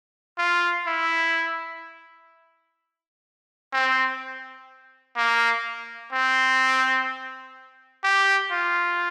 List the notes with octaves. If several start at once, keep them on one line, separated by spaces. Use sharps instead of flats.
F4
E4
C4
A#3
C4
G4
F4